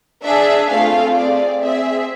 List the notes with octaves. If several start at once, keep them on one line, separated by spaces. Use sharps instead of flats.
D4 G#4 E5
A3 C4 F4 A4 F5
C4 G#4 D5
C4 G#4 E5